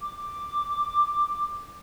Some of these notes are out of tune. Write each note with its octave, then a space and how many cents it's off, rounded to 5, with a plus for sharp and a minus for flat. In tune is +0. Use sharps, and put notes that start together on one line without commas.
D6 +5